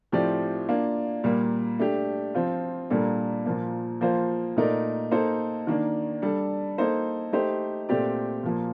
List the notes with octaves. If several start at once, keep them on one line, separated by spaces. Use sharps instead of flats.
A2 F3 C4 G4 D5
A#3 D4 F4
A#2 G3 A#3
A3 D4 G4
F3 C4 F4
A#2 G3 A#3 D4 A4
A#2 F3 A#3
F3 A#3 F4 C5
A#2 A3 D#4 A#4 D5
A#3 D#4 A4 C5
D#3 A#3 D4
G3 D4 A4
A#3 D#4 A4 C5
A3 D#4 G4 C5
A#2 A3 C4 G4 D5
A#2 F3 A#3